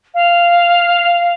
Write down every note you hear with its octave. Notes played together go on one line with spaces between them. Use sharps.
F5